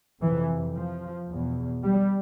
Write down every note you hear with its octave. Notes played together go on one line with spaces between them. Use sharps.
F2 C3 E3
F3
E2 B2
G3